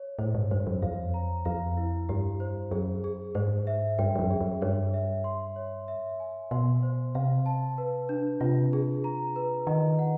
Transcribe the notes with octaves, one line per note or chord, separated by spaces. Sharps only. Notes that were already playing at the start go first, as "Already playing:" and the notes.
Already playing: C#5
A2 C5
G#2
G2 C5
F#2
F2 F5
A#5
F2 F5
E4
G2 G4
C5
F#2 G#4
G#4
G#2 C5
E5
G2 G5
G2
F#2
G#4
F#2
G2 C#5
E5
C6
C#5
E5
G#5
B2 C6
C5
C3 F5
A5
B4
D4
C3 F4
G#4
A#5
B4
D#3 D#5
F#5